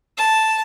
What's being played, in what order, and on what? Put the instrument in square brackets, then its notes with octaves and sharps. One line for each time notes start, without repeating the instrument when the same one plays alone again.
[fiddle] A5